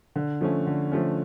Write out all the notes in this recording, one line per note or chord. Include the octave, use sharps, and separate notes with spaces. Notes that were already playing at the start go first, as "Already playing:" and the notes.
D3
F3 A3 C#4
D3
F3 A3 C#4